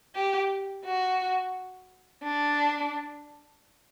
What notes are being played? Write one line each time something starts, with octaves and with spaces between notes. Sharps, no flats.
G4
F#4
D4